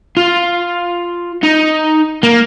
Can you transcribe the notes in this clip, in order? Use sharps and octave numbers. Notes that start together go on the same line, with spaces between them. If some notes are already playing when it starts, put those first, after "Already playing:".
F4
D#4
A#3